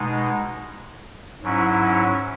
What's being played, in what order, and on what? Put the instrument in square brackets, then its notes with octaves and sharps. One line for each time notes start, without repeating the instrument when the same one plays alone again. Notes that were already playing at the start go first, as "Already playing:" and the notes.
Already playing: [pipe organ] B2 G#3 D#4
G#2 F#3 C#4 E4